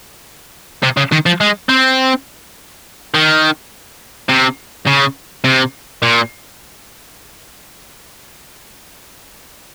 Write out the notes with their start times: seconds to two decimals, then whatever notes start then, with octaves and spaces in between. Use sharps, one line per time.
0.83 C3
0.97 C#3
1.12 D#3
1.26 F3
1.41 G#3
1.69 C4
3.14 D#3
4.29 C3
4.86 C#3
5.44 C3
6.03 A#2